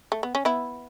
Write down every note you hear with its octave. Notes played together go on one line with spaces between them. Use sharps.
A3
B3
C#4
B3 E4